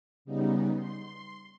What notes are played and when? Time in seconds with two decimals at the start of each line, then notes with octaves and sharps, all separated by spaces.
0.25 C#3 G3 B3 D#4
0.75 C6